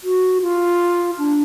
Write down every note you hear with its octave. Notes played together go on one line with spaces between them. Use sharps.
F#4
F4
D4